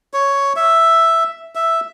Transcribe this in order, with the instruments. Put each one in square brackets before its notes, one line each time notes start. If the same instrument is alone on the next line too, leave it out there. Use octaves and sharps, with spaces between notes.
[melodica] C#5
E5
E5